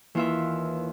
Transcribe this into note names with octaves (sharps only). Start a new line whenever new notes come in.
D#2 E3 F4 E5